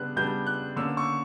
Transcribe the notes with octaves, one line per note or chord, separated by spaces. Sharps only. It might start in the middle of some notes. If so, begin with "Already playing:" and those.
Already playing: C#3 G3 B3 D4 F#6
C#3 G3 B3 D4 G6
F#6
D3 A#3 C#4 E6
C#6